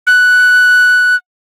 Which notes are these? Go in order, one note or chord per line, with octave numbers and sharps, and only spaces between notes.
F#6